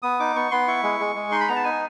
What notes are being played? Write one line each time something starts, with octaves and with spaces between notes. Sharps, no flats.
B3 D#6
D#4 D6
B3 C#6
B3 C6
E4 C#6
G#3
G#3
G#3
D#4 C6
B5
B3 A#5
A5
D#4 G#5